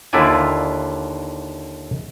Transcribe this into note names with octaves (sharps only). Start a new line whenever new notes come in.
D#2 D3 E4 F4 D5 G#5